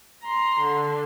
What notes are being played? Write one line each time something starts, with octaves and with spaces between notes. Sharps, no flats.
A#5 C6
D3